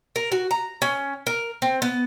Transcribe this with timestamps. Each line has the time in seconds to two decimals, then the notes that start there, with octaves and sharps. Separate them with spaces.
0.16 A#4
0.32 F#4
0.51 A#5
0.82 C#4
1.27 A#4
1.62 C4
1.82 B3